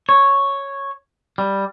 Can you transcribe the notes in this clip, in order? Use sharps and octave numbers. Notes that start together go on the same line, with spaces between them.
C#5
G3